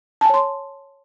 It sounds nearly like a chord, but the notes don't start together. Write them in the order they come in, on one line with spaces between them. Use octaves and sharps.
A5 G#5 C#5 C6